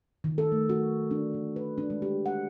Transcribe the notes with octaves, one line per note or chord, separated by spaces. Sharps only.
D#3
A4
A3
F#4
D4
D#3
B4
D4
G#3
G4
F#5